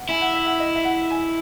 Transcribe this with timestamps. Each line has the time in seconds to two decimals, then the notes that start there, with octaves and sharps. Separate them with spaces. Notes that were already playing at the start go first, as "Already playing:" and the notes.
Already playing: F#5
0.09 E4 G#5
0.21 F#5
0.34 E5
0.46 F#5
0.60 D#5
0.76 E5
0.85 F#5
1.10 G#5